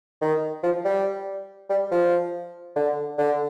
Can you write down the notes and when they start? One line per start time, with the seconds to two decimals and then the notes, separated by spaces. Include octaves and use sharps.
0.22 D#3
0.64 F3
0.85 G3
1.70 G3
1.91 F3
2.76 D3
3.18 D3